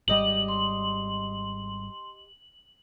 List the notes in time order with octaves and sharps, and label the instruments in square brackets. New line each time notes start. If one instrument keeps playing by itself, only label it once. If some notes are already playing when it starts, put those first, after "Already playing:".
[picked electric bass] G#1 G3 [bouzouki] G4 D#5 [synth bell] F#7
[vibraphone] C6